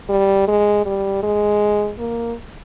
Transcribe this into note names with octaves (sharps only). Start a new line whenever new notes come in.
G3
G#3
G3
G#3
A#3